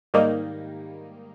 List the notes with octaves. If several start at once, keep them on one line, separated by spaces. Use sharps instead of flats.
G#2 D#3 G3 A#3 D#4